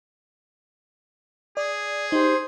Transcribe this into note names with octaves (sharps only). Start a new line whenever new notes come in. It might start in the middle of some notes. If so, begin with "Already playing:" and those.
G#4 D5
D#4 G4 C5